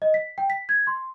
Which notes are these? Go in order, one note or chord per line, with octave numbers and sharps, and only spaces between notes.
D#5
B6
G5
B6
G#6
C6